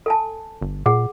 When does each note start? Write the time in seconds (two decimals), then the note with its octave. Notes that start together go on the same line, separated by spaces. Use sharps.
0.06 A4 G#5 A5
0.61 G1
0.86 A#2 G#4 F#5